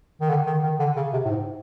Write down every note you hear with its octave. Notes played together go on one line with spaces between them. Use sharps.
D#3
D3
D#3
D#3
D3
C#3
C3
A2
G#2